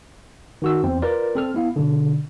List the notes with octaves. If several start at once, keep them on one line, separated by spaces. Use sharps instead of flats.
D#3 F#4 E6
E2 C4
F4 A#4 B4 D5
C4 A4 F6
B3 E4 F5
B2 D3